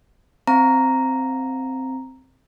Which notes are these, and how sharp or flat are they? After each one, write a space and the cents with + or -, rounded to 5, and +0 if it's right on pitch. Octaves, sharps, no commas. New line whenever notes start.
C4 +0 F5 -30 A#5 +0